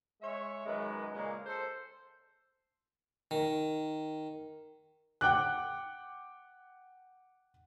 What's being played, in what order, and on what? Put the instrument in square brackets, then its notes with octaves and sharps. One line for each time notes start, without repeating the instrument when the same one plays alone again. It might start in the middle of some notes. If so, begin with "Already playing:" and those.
[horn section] G#3 C#5 E5
F#2 D#3 G#3 B4
A#2 C#3 G#3 A#3
A4 C5
[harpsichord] D#3
[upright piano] F#5 G5 D6 F#6